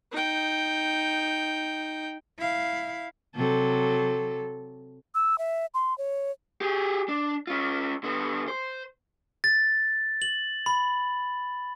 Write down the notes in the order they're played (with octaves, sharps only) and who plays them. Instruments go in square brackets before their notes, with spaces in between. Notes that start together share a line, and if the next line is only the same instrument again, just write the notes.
[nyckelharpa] D#4 G5
[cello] E4 F5
[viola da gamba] C3 F#3 A4
[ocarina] E6
E5
C6
C#5
[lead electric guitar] G4 G#4
D4
C#4 F4
D3 B3
C5
[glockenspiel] A6
F#7
B5